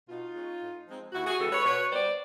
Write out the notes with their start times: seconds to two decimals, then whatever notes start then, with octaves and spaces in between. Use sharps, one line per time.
0.08 B2 D#4 F4
0.34 G#3 C#4
0.61 A2
0.86 F3 G#3 C4 D#4
1.13 D#2 E4 F#4
1.26 F#4 G#4
1.39 C#3 E3 G#3 G4 A4
1.52 B4 C#5
1.65 B2 B4 C#5
1.91 G3 B3 C5 D5